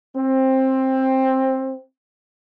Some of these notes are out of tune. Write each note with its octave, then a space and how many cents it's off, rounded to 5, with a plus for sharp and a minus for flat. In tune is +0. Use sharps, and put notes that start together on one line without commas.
C4 +15